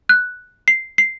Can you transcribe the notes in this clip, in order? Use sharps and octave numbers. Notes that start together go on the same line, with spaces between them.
F#6
C7
C7